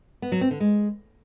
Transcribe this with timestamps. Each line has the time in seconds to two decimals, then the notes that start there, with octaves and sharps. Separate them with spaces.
0.22 B3
0.32 F#3
0.41 C4
0.51 D3
0.60 G#3